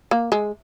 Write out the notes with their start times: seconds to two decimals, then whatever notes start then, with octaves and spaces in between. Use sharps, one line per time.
0.11 A#3
0.32 G#3